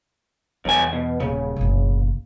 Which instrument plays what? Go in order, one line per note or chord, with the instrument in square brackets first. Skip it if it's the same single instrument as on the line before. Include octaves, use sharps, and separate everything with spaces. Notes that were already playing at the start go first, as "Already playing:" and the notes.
[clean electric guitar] B1 G#5 [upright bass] E2
[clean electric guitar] B2
[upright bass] D#1 [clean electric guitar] C#3
[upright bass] F#1 B1